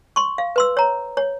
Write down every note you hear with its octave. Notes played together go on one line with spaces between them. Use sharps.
C6 C#6
F5
B4 C6 E6
C#5 A#5
C#5